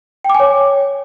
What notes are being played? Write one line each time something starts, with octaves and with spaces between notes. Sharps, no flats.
G5
D6
G#5
C#5